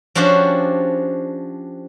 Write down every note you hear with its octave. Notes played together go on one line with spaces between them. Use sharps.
F3 C#4 D4 F#4 G4 C5